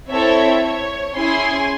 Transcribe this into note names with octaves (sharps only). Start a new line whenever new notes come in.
C4 E4 A4 C#5 E5
C#5
C#4 E4 G#4 G#5 C6